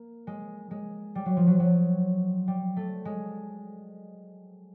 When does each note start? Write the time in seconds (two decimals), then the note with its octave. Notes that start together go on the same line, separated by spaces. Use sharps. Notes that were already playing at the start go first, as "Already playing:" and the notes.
Already playing: A#3
0.27 G#3
0.71 G#3
1.15 G3
1.26 F#3
1.37 F3
1.47 F#3
1.60 F#3
2.48 G3
2.77 A3
3.05 G#3